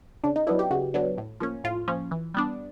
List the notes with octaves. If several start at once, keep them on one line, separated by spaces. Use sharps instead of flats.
C#3 D4
D#4
F#3 B3 D4 E4
G4
C#3 F#4
F#3 B3 D4
A2
F3 A#3 C#4
A2 F4
F3 A#3 C#4
E3
G3 B3 D4